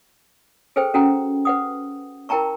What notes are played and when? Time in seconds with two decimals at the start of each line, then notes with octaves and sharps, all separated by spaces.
0.76 G#4 A4 B4 C5 G5
0.94 C#4 F#4 A4 F#5 G5 A#5
1.45 B4 F#5 D#6
2.29 E4 A#4 G5 A5 A#5 C#6